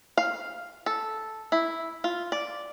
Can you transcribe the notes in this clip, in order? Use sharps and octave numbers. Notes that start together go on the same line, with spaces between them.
F5
A4
E4
F4
D5